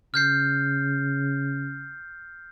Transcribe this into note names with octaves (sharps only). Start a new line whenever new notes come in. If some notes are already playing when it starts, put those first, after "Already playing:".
C#3 F6 G6 C7